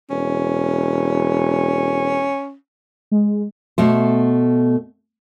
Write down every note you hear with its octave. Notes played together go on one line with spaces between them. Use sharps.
E1 C#4
G#3
B2 A3 C5